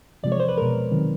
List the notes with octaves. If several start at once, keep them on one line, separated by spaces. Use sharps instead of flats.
E2 C3 F3 G#3 D5
C#5
C5
B4
B2 G#3 A#4
C3 D#3 F#3